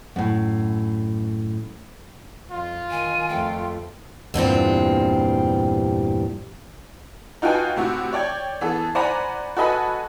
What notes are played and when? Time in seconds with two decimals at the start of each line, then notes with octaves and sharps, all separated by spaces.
0.16 F#2 A2
2.51 F2 F4
2.91 D#3 G#5
3.29 F2 A3 G5
4.34 E2 G2 A#2 C4
7.42 D#4 F4 F#4 B4 G5 G#5
7.76 A2 C3 F#4
8.13 C#5 D5 G5 G#6
8.61 E3 B3 G#4 A4
8.95 C5 D5 F#5 G#5 A#5 B5
9.57 F#4 A4 B4 D#5 G#5 B5